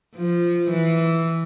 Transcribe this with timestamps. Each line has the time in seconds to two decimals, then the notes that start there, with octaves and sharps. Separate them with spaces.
0.16 F3
0.70 E3